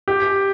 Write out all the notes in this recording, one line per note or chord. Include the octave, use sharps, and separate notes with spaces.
G4